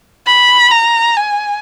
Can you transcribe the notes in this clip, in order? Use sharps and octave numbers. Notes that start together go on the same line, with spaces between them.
B5
A#5
G#5